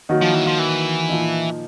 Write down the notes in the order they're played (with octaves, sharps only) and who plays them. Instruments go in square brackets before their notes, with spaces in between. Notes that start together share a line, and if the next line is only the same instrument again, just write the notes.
[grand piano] D#3 F#3 A#3 D#4 F#4
[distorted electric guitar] F3
E3
F3
E3
[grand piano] A#2 F3 A#3 D#4